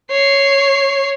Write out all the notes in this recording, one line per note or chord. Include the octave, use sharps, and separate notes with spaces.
C#5 C7